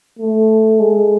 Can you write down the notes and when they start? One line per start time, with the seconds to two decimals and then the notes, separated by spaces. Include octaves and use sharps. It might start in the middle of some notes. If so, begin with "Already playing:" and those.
0.19 A3
0.80 G#3